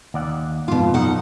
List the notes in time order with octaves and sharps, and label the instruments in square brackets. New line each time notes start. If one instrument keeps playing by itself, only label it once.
[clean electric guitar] D#2 D5 F#5
[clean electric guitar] G#2 [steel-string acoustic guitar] B2 F4
[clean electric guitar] B2 F#3 B3 [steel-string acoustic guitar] D#4 F#5